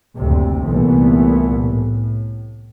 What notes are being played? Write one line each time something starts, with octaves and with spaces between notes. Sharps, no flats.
F#1 D2 A2 C3
C2 A#2 E3 A3 B3
A2